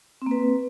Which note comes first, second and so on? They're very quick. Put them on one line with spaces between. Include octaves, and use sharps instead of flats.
C4 A#3 B4